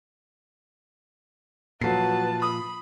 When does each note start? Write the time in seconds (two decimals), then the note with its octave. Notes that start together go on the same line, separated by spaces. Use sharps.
1.81 A#2 F3 F#3 F#4 B4 A5 C7
2.42 B5 D#6